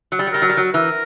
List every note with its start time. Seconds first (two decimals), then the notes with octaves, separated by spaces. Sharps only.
0.12 F#3
0.19 G3
0.27 F#3
0.33 G3 A#4
0.42 F#3
0.50 G3
0.57 F#3
0.74 E3 A#4